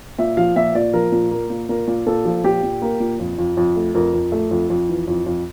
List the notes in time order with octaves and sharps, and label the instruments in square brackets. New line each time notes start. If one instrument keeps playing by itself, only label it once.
[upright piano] A#2 E5
F3 F5
A#2 E5
A#2 D5
F3 A#4
A#2
A#3
A#2
A#2 A#4
A#2
A#2 A4
F3
A#2 G4
A#2
A#3
A#2
F2
F2
F2
A3
F2 A#4
F2
A3
F2
F2
E3
F2
F2